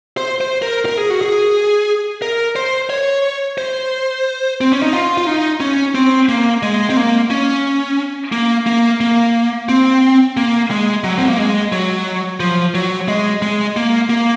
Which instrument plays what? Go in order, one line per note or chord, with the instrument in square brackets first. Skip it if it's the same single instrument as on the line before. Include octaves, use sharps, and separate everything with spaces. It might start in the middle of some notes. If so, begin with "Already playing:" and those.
[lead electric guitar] C5
C5
A#4
A#4
G#4
F#4
G#4
A#4
C5
C#5
C5
C4
C#4
D#4
F4
F4
D#4
C#4
C4
A#3
G#3
C4
A#3
C#4
A#3
A#3
A#3
C4
A#3
G#3
F#3
C4
A#3
G#3
F#3
F3
F#3
G#3
G#3
A#3
A#3